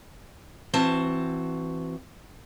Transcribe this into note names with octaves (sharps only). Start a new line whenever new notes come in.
E3 C4 F#4 A5